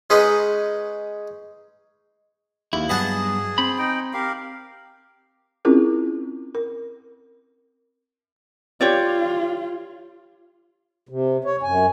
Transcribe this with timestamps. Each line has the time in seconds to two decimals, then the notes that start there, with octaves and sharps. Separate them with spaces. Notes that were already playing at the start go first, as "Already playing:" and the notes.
0.10 G#3 C#4 D#4 B4 D#5
2.73 D#2 E4
2.89 G2 F#3 B3 G#4 D#5 F#5 A5
3.58 C4 B5
3.78 D#4 G5
4.13 G4 A#4 F5
5.65 C4 C#4 E4 F4 G#4 A#4
6.55 A#4
8.81 F4 G4 C#5 D5
11.09 C3
11.44 C#5
11.63 F#2 G#5